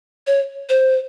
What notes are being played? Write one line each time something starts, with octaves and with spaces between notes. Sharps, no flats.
C#5
C5